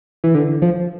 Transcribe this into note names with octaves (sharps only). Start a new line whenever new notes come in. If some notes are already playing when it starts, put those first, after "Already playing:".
E3
D3
F3